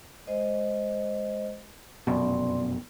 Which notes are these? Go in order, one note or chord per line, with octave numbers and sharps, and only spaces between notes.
G#3 C5 D#5
F1 F#2 B2 D5 C6